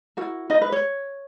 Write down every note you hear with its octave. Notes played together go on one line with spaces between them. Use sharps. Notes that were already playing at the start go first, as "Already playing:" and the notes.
E4 F#4 A#4 F#5
D#4 D#5
B4
C#5